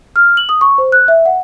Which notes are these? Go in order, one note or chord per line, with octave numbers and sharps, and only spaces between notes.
F6
F#7
D#6
C#6
C5
F#6
E5
F#5